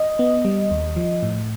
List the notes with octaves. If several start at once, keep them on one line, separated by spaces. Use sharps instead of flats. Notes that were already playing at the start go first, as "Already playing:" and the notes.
Already playing: D#5
B3
G3
D#2
F3
A2